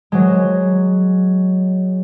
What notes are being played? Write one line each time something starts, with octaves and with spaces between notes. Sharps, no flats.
F#3 G#3